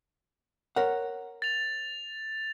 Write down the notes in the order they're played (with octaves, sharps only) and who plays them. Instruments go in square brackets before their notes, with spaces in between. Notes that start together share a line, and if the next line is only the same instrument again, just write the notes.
[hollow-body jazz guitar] A#4 C#5 F#5
[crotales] A6 F7